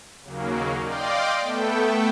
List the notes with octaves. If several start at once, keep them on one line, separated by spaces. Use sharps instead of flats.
D#2 C#3 F#3 A#3
D5 D#5 F5 G5 C6 D6
A3 B3 A4 G5